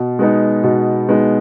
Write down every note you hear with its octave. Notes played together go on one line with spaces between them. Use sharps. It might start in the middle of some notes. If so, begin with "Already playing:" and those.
Already playing: B2
G#3 B3 D#4
B2
G#3 B3 D#4